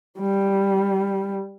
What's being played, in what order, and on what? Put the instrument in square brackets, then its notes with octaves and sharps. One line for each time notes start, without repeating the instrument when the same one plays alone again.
[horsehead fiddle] G3